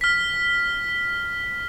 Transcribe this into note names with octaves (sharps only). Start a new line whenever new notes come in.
F6 B6